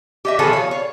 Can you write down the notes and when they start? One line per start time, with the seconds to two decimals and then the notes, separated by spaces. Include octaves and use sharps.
0.25 G4 D#5 E5
0.39 B2 D#3 F3 F#4 G#4 A4
0.53 C#5 F5
0.71 C#5